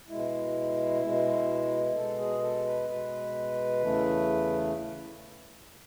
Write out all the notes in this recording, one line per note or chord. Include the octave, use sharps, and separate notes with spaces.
B2 G#3 E4
B2 G#3
B2 G#3 A4
G#4
A4
B4
B2 G#3 B4
E2 C#3 E3 A3